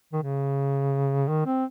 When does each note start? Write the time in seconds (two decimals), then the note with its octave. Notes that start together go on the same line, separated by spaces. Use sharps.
0.13 D#3
0.22 C#3
1.28 D#3
1.46 C4